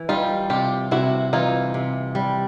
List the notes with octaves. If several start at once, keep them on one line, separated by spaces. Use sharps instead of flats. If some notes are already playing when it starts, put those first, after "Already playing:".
Already playing: E3
G3 D#4 F4
C3 F4 G4
C3 E4 F#4
E3 D#4 F4
C3
G3